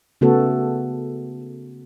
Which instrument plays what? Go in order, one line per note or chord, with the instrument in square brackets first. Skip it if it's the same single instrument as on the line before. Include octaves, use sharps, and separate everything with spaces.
[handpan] C#3 A3 B3 F#4 A4